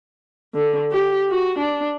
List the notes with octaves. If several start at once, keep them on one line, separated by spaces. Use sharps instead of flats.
D3
G4
F#4
D4